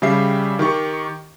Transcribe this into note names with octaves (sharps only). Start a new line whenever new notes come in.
C#3 G3 G4 E5 C7
D#3 G4 C#6